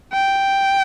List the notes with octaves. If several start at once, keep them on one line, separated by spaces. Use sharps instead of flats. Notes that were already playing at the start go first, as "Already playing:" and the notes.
G5